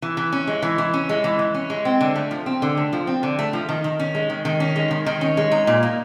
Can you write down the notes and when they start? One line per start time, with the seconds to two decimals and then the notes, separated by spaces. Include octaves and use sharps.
0.02 E3
0.17 E3
0.32 C#4
0.47 G#3
0.62 E3
0.78 E3
0.94 C#4
1.09 G#3
1.24 E3
1.39 E3
1.54 C#4
1.70 G#3
1.85 C4
2.01 D3
2.16 A3
2.31 F3
2.46 C4
2.62 D3
2.77 A3
2.93 F3
3.07 C4
3.23 D3
3.39 A3
3.53 F3
3.69 D#3
3.84 D#3
4.00 C#4
4.15 G#3
4.30 D#3
4.45 D#3
4.60 C#4
4.76 G#3
4.91 D#3
5.06 D#3
5.21 C#4
5.37 G#3
5.51 D#4
5.67 A#2
5.83 A#3